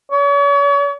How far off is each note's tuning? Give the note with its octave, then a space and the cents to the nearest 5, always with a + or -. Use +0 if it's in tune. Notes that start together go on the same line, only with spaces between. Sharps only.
C#5 +40